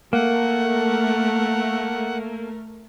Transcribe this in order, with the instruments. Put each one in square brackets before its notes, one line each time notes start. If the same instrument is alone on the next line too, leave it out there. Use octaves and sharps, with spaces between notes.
[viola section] A3 A#4 [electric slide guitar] A#3 [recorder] F#5